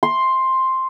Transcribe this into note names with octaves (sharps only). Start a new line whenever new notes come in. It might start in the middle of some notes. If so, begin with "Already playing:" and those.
C6